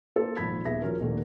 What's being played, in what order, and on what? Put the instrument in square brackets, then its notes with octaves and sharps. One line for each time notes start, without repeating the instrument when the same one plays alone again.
[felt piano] A#3 A4 C5
G#1 A#2 F3 B5 G#6 B6
D#1 B3 G#4 E5 A#6
F3 C#4 F#4 A#4
D#1 D#3 A3 A#3 D4